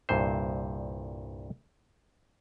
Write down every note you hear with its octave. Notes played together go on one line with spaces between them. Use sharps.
C2 G2 A#2 C5